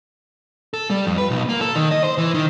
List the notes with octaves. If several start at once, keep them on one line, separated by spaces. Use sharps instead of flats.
A4
G3
F2
B4
B1
A#3
A4
D#3
D#5
C5
E3
D#3